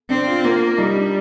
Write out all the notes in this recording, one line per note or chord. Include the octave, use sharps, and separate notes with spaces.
C4 D4
F4
A#3 F4
G3 D#4
D4